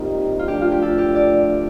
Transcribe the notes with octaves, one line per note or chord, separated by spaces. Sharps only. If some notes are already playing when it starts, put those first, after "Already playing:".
Already playing: C3 G3 A#3 D#4 F4
F4
G2 F3 A3 D4 G4
F4
G4
A4
G4
D5